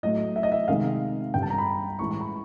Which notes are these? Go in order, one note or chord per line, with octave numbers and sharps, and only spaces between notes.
A2 F#3 A3 D#5
E5
D#5
E5
C3 D#3 G#3 F5
G2 D3 G3 G5
A5
A#5
B5
A2 E3 G#3 C#6
C#6
B5